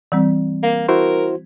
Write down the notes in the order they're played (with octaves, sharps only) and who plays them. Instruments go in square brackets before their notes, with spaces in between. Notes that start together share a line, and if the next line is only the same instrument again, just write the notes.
[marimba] E3 G3 C4
[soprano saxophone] A#3
[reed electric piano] E4 F#4 C5 [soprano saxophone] A#4